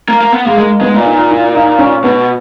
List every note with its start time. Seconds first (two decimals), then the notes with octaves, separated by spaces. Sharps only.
0.08 A#3
0.21 A#3
0.32 B3
0.45 G#3 A#3
0.57 G#3 A#3
0.81 G#3 B3
0.94 A#2
1.06 D#4
1.31 E4
1.55 D#4
1.79 C#4
2.04 B2 B3